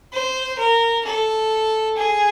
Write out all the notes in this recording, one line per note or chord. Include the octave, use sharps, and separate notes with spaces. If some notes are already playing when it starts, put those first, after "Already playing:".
C5
A#4
A4
G#4